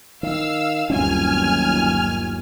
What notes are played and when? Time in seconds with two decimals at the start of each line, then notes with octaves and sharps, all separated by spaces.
0.23 D#3 F5 E6
0.90 G1 D#2 F#3 G3 C4 C#4 G#5 F6